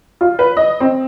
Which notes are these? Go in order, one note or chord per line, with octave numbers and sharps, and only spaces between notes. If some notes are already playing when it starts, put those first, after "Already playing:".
F4
B4
D#5
C4